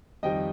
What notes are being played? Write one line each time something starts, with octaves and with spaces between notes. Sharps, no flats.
F2 D#3 G3 D#5 G5